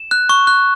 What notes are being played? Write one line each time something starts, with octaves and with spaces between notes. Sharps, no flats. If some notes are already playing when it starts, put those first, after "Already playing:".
Already playing: E7
F#6
C#6
F#6